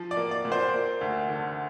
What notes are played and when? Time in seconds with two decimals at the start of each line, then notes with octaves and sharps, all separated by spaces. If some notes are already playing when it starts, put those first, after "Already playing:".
Already playing: F3
0.11 D5
0.17 A#3
0.31 D5
0.45 A#2
0.52 C5
0.74 A#3
1.01 D2
1.29 D3